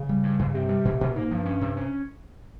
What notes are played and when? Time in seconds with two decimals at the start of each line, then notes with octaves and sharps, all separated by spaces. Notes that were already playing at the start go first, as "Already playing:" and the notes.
Already playing: C#3
0.09 G3
0.23 G2
0.39 G2
0.55 C3 C4
0.69 G3
0.85 A#2
1.01 A#2
1.15 G#2 A#3
1.31 G2 F3
1.46 C#4
1.61 C3
1.77 C#4